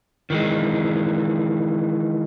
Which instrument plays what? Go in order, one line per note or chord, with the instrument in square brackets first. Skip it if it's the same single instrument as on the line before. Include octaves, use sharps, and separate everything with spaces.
[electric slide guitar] D#3 E3 G#3